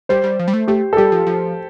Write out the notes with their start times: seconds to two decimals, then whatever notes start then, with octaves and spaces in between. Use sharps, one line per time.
0.09 G3 C5
0.24 G3
0.39 F3
0.48 G3
0.54 A3
0.68 A3 G4
0.93 A4
0.97 G3 G4
1.12 F3
1.27 F3